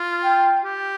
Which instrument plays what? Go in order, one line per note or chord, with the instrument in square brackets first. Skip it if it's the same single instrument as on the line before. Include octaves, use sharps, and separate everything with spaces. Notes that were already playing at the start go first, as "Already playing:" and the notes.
Already playing: [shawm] F4
[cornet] G5
[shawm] G4